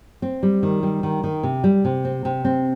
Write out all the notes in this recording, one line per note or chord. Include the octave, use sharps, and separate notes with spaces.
C4
G3
D#3
G3
D#3
D#3
C3
G3
C3
C4
C3
C4